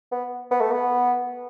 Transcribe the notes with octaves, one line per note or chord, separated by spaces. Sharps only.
B3
B3
A3
B3